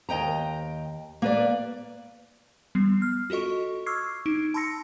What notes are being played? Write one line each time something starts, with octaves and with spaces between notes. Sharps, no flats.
D#2 D#5 G5 A#5
A#3 B4 D5
G3 B3 C7
F6
F4 F#4 A4 D#5 C#6
C#6 D6 E6 F6 G#6 C7
D#4 D7
A5 B5 C6 E6 A#6 C#7